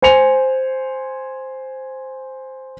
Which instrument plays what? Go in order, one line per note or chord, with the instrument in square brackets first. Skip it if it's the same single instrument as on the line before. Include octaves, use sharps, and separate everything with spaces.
[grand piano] C5 G#5 C6 C#7 F7